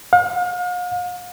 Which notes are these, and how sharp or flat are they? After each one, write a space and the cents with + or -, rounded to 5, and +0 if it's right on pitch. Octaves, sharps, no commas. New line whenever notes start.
F5 +45